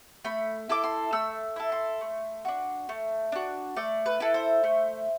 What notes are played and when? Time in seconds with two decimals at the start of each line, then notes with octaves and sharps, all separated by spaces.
0.25 A3 B5
0.69 E4 A4 D6
0.84 C6
1.12 A3 E6
1.56 E4 A4
1.72 C6
2.01 A3
2.45 D4 F#4
2.89 A3
3.32 D4 F#4
3.76 A3 D5
4.06 B4
4.20 E4 A4
4.34 C5
4.64 A3